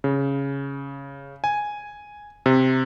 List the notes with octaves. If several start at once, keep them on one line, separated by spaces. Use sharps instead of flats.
C#3
G#5
C3